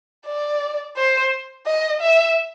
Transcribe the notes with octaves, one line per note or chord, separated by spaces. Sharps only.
D5
C5
D#5
E5